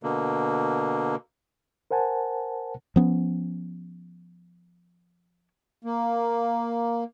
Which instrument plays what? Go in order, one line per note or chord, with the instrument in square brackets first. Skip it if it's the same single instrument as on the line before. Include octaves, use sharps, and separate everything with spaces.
[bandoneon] B2 D3 A#3
[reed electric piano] A#4 C5 F#5 G#5 A5
[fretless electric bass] F3 B3 C#4
[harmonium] A#3